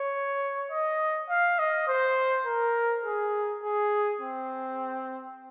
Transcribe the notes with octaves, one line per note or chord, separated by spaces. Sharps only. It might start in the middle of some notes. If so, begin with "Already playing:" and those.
Already playing: C#5
D#5
F5
D#5
C5
A#4
G#4
G#4
C4